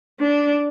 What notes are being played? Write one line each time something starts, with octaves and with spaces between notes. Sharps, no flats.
D4